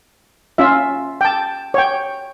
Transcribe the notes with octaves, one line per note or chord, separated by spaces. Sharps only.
C#4 F4 E5
G5 A5
C#5 G5